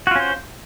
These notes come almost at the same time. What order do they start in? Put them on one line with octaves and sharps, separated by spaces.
F#4 F4 C#4 C5